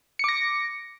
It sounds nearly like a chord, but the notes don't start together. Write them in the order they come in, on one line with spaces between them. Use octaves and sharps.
C#7 D6 A#6